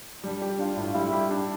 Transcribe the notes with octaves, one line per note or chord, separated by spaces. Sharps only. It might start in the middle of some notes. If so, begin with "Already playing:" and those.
G3 D4
G4
D4 F4
A2
G3 E4
G4
D4